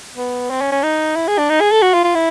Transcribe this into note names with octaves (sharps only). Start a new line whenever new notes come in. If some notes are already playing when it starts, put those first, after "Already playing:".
B3
C4
C#4
C#4
D#4
E4
G#4
D4
D#4
G#4
A4
F#4
F4
F4
E4